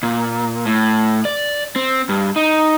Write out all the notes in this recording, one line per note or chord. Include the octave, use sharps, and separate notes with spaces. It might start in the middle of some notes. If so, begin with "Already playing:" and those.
A#2
A2
D5
C4
G2
D#4